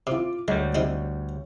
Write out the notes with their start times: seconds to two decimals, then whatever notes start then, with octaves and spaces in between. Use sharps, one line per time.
0.07 C3 F4 D6
0.48 D2 G3 G#3 C#5
0.75 C3 D#4 E4